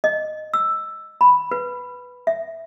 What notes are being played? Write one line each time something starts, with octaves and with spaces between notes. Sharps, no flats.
D#5
E6
B5
B4
E5